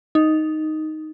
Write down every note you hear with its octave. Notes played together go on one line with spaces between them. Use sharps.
D#4